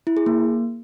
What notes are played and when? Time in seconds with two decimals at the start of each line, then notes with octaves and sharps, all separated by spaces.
0.07 E4
0.17 G#4
0.26 A#3